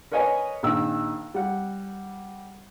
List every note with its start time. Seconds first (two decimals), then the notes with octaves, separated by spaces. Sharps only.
0.12 A#4 B4 C#5 D#5 G#5
0.63 A#1 D#3 E6
1.34 G3 F#5